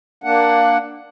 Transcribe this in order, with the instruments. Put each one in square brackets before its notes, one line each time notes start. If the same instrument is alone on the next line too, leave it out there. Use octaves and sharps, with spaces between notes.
[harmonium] A#3 D4 F#5